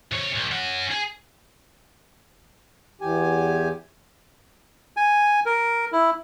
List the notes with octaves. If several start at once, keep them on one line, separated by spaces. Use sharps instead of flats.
C3 C#5
B1
C#4 F#5
G#4
E2 G4 G#5
G#5
A#4
E4